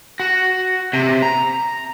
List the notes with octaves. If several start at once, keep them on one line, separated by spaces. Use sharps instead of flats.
F#4
C3
A#5